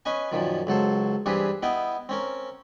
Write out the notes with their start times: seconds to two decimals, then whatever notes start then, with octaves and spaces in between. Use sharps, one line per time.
0.05 C#4 B4 D#5 G#5
0.32 F#2 A#2 D#3 F3
0.67 C#2 F#3 A4 C5
1.26 G2 E3 C4 G4 G#4 B4
1.63 B3 E4 D#5 G5
2.09 C4 C#4 A#4